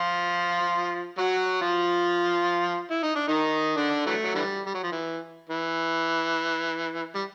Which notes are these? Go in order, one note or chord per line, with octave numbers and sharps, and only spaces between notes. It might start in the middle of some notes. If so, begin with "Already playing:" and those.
Already playing: F3 F4
F#3 F#4
F3 F4
E4
D#4
D4
D#3 D#4
D3 D4
E3 F#3 A3
F#3
D3 E3 G3
G3
F#3
F3
E3
E3
G3